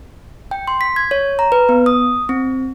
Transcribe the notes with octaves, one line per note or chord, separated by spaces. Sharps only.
G5
C6
B6
G#6
C#5
A#5
B4
B3
D#6
C4